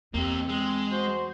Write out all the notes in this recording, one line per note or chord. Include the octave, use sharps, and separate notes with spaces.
E2 A#3 C4 G4
G#3
F#4 C5